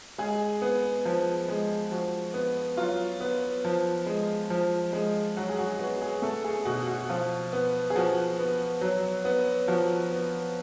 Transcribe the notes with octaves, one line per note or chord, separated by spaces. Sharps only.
G#3 G#4
B3
F3
G#3
F3 F#4
B3
F#3 F4
B3
F3
G#3
F3
G#3
F#3 F#4
G#4
F#4
B3 F#4
G#4
A3 A4
G#4
B2 F#4
F#4
F3 F4
B3
G#4
F3 F#4
B3
F#3
B3
F3 F#4
B3